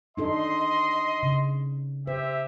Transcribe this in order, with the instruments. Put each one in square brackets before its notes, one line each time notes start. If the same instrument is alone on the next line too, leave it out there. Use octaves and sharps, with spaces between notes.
[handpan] D4 D#4 A4 [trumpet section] D#5 C6
[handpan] C#3
[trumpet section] G4 E5 [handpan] C5